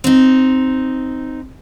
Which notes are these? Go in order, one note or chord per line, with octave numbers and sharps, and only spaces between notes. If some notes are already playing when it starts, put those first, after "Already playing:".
C4 D#4